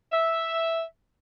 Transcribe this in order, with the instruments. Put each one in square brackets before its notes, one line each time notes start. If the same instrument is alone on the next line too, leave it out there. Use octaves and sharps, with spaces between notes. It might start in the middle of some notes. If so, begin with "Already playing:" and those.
[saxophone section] E5